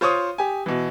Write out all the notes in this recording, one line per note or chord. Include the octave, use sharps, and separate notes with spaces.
F4 C5 C#5 C#6 D#6
G4 G#5
B2 E3